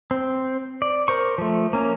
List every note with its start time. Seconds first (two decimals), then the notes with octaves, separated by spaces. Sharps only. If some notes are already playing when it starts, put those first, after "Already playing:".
0.11 C4
0.82 D5
1.08 A#4 C5 C#6
1.38 F3 A3
1.73 A#3 C#4